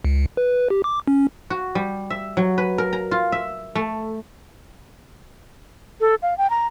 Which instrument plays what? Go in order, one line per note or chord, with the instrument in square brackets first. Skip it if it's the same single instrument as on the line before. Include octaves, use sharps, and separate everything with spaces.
[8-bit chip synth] C#2
B4
G4
D6
C#4
[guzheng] F#4
G3
E5
F#3
B4
A#4
A#5
F4
E5
A3
[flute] A4
F5
G5
A#5